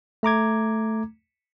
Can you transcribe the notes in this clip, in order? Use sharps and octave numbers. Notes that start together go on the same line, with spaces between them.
A3 A#5 D6 G#6